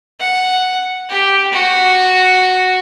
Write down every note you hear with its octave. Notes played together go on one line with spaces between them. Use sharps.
F#5
G4
F#4